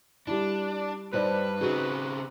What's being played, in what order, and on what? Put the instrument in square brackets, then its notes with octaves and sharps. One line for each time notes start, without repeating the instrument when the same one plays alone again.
[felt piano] G3 E4 [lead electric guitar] D4
[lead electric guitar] G2 [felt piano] D#4 C5 D5 [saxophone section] B4
[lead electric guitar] C#3 C4 [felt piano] D#4 F#4 G#4